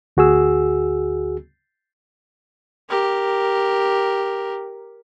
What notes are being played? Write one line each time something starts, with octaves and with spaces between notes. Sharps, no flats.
D2 F#4 G#4 E6
G4 A#4